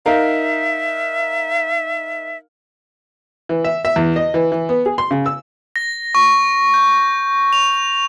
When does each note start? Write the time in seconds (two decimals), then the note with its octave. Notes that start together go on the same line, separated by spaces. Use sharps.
0.06 D#4 A#4 E5 F5
3.49 E3
3.64 E5
3.85 E5
3.96 E2
4.16 D#5
4.34 E3
4.52 E3
4.69 B3
4.86 G#4
4.98 C6
5.11 C#3
5.26 E6
5.76 A#6
6.15 C#6
6.74 G6
7.53 F7